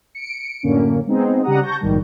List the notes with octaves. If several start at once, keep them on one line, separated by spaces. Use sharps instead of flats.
C#7 D7
F#2 A2 D3 A#3 C#4
G#3 B3 C4 D#4 G#4
C#3 G3 G4 F#5 A#5 D#6
A5 C#6 G6 A#6
A#1 G#2 B2 D#3 G3